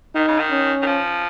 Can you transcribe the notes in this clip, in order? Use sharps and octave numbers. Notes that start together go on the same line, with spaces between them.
D#3 D#4
C#3
D#3
C#4
D#3
F3